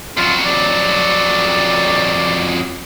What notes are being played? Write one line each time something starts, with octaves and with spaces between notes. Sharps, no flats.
F2 F#3 F4
D5